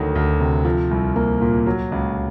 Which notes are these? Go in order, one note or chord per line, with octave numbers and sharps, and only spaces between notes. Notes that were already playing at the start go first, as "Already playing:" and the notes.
Already playing: D2 D#3 F#3
D2
C3
F3
C2
A#3
A#2
F#3
C#2